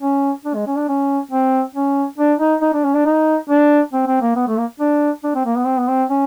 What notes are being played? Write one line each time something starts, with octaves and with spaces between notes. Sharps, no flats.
C#4
D4
G#3
C#4
D4
C#4
C4
C#4
D4
D#4
D#4
D4
C#4
D4
D#4
D4
C4
C4
A#3
B3
A3
A#3
D4
D4
C4
A#3
B3
C4
B3
C4
C#4